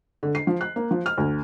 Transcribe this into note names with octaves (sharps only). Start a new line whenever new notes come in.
D3
C7
F3
F#6
A#3
F3
F6
D2